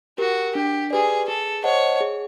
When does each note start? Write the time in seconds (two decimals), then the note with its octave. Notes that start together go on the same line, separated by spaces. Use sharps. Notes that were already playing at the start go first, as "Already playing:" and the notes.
0.18 F#4 G4 A#4
0.55 D4 G4
0.91 G4 G#4 B4 D5
1.28 G#4 A4
1.64 C5 C#5 D#5 F#5 A5
2.01 G#4